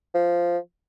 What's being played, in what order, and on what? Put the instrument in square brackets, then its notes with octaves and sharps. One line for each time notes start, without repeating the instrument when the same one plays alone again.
[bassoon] F3